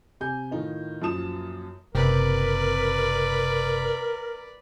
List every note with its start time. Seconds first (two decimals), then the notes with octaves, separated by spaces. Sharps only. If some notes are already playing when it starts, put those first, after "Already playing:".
0.20 C3 G4 G#5 G6
0.51 A2 D#3 D#4 F4
1.02 F#2 A#2 F3 A5 D#6 E7
1.95 F#1 C3 A#4 B4 D5